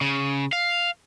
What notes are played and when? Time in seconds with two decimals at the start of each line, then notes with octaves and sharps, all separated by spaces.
0.01 C#3
0.53 F5